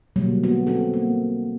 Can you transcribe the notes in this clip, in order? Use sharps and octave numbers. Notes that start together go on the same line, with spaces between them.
B2 D3 F#3 G3 A#3
B3 F#4
C4 F#4 A4
A#3